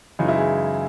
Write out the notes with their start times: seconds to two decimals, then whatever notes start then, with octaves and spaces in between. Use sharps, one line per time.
0.19 F#2 C#3 E3 G#3 D#4
0.28 E4
0.38 G#4